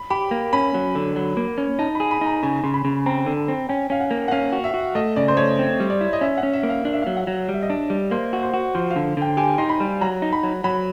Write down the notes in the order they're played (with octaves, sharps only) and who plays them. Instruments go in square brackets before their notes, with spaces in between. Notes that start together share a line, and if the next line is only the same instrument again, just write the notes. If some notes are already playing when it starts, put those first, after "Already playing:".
Already playing: [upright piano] B5
[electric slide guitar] G4 [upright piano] B5
[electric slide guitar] A#3
[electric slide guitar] C#4 [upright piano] B5
[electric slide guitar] F#3
D3
F#3
A#3
C#4
[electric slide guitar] D#4 [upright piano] A5
[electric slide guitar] G#4 [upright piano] B5
[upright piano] B5
[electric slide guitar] D#4
[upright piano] A#5
[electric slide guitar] C#3 [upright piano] G#5
[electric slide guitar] C#3 [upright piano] C6
[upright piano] B5
[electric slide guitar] C#3
[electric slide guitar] C4 [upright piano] A#5
[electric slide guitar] D3
[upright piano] A5
[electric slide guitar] C4
[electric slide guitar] C#4 [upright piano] G5
[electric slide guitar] C#4 [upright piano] F5
[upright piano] F#5
[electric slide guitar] A#3
[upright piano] F#5
[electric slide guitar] C#4 [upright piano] F5
[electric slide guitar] F#4
[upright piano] E5
[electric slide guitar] F#4
[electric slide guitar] A3 [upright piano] D#5
[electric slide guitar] C#3 [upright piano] D5
[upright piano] C5
[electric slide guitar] A3 [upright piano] C#5
[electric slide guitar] C4
G3
[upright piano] D5
[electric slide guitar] E4
[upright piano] D#5
[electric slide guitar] C#4 [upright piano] E5
[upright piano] F#5
[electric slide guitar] C#4
[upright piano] E5
[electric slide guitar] A#3
[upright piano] F5
[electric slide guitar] D4 [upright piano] F5
[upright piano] E5
[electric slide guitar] F#3 [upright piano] F5
[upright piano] F#5
[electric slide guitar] F#3
G3
[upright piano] E5
D#5
[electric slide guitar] D4 [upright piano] D5
[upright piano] C#5
[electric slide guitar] G3
[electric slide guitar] A#3 [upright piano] C5
[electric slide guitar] F#4
[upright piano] C5
[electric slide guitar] F#4
[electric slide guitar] F3 [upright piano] C5
[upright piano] F5
[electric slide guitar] D3
[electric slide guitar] D3 [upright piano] G5
[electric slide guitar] G4 [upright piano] G#5
[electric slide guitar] D#4 [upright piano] C6
[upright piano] B5
[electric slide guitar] G3
[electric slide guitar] F#3 [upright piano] A#5
[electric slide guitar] D#4
[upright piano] B5
[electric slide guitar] F#3
[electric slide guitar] F#3 [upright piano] B5